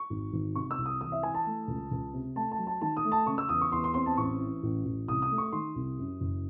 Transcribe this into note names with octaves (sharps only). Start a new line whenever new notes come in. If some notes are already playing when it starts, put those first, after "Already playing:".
Already playing: C#6
G#1
G#1
C3 C#6
E6
C2
D#6
E3 D#6
E5
E3 G#5
A5
A3
C#2
C#2
C3
A3 A5
A5
F#3
A5
D#3 A5
D#6
A3
A5
C#3 C#6
E6
E2 D#6
C#6
E2 C6
C6
C4 C6
A5
A1 C#6
E3
A1
A1
C2 D#6
D#6
A3
C#6
D#3 C6
C2
F#2
F#1